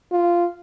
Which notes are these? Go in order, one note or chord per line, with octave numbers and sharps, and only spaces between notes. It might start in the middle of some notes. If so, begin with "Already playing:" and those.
F4